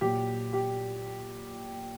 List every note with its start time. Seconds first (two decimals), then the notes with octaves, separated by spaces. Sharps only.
0.01 A#2 F#3 G4
0.53 G4